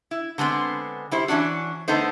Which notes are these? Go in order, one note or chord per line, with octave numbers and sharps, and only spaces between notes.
E4
D3 G#3 B3 C4
G3 E4 C5
E3 C#4 D4 F#4
D3 A3 B3 D#4 C5